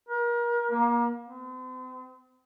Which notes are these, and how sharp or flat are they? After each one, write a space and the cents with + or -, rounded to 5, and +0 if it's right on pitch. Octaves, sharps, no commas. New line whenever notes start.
A#4 +35
A#3 +30
C4 -40